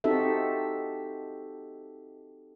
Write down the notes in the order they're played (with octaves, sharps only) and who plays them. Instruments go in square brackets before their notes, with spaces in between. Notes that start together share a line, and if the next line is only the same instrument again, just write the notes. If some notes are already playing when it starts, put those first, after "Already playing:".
[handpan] C4 D#4 F#4 G4 A4 E5